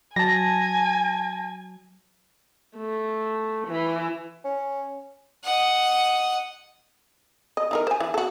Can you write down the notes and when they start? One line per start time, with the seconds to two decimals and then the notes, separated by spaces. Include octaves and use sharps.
0.16 F#3 G#5 A5 A#6
2.76 A3
3.68 E3
4.44 C#4
5.44 D#5 F#5
7.57 D#5
7.71 E3 D#4 A#4
7.87 C5 G#5
8.00 E3
8.14 F#4 A4